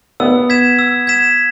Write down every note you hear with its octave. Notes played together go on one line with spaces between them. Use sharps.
B3 E6
G#6 B6 E7
E6
G#6 B6 E7